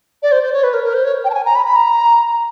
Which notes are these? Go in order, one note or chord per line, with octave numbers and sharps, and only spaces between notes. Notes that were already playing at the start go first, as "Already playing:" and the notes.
D5
C5
C5
C#5
B4
A#4
A#4
C5
C#5
G5
A5
G#5
A#5
B5
B5
A#5